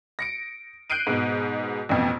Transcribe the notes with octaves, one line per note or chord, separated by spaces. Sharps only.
A#6 C#7 D7
F#6 G6 C7 D7 D#7
G#2 B2
A1 F2 B2